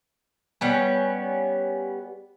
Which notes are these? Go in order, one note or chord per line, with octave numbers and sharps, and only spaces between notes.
G3 B3 C#4